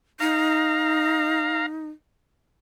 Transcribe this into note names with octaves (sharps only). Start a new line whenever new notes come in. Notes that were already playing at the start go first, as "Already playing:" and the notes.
D#4 F5 A#5